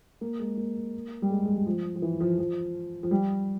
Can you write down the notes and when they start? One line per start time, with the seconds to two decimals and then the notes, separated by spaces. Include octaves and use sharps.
0.21 A#3
0.39 G#3
0.57 A#3
1.22 G3
1.30 G#3
1.46 G#3
1.56 G3
1.66 F3
1.96 F3
2.02 E3
2.20 F3
2.39 F3
3.03 F3
3.11 G3